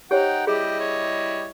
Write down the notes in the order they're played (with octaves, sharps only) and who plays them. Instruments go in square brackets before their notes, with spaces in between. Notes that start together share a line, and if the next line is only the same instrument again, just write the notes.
[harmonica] D#4 F#5 [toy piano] G4 C5 C#5 [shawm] G5
[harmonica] G3 E4 D#5 [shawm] G4 [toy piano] G#4
[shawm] C#5